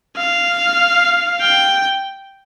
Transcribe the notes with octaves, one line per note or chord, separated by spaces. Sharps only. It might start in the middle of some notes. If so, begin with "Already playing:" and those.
F5
G5